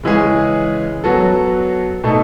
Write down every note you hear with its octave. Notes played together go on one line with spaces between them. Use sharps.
C#3 E3 G#3 C#4 G#4
F#3 B3 F#4 A4
B2 A3 D#4 A4